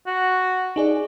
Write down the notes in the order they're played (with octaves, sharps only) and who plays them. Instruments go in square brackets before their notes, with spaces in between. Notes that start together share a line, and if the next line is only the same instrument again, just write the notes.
[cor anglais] F#4
[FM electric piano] D#4 G#4 D5